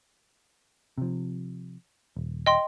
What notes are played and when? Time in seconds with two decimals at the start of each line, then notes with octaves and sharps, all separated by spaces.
0.98 C3 F3
2.17 D#1
2.46 D#5 G5 C6